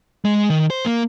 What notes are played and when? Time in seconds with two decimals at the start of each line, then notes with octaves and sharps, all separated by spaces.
0.25 G#3
0.49 D#3
0.70 C5
0.86 A#3